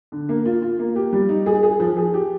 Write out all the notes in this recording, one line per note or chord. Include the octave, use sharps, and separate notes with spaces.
D3
A#3
F4
F4
A#3
G4
G3
D#4
G#4
G#4
F3
G#4
G4